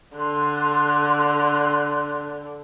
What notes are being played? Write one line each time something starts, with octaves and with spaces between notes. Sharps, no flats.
D3 C6 F#6